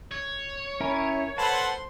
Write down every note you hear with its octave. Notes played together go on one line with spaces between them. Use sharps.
C#5
C#4 E4 A#4
A4 B4 C5 F#5 A5 C6